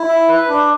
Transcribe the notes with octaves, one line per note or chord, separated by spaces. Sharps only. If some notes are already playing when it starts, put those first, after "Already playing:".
Already playing: E4
E5
B4
D4